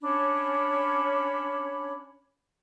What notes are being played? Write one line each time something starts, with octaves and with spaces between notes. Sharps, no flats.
C#4 D4 C#5 B5